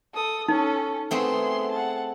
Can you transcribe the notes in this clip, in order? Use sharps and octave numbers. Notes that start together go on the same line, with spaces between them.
A4 D#6
C#4 D#4 A4
A3 B3 C4 G#4 C6
F#5 A5